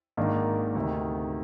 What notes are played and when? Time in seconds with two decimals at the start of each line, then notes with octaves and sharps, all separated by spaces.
0.17 G#1 G#2 D#3 A#3 D4
0.75 D2 C3 D#3